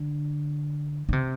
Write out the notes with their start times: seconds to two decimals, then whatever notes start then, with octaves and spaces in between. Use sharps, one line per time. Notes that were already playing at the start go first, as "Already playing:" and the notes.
Already playing: D3
1.09 D3
1.13 C3